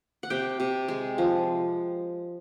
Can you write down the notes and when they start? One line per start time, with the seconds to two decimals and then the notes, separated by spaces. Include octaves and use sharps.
0.23 F#5
0.30 C3 G5
0.60 C3
0.88 G#3
1.18 F3